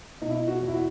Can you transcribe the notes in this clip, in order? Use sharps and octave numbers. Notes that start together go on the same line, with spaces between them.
B2 D#4
E4
D#4
F#4
E2
E4
F#4